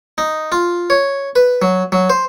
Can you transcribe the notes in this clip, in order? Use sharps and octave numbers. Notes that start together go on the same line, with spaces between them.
D#4
F4
C#5
B4
F#3
F#3
C5